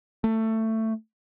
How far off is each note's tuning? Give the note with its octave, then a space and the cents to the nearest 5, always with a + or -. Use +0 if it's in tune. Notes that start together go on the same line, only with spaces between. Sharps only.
A3 +15